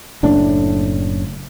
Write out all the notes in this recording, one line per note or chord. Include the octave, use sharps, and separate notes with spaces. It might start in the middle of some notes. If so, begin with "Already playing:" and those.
F#1 A2 D4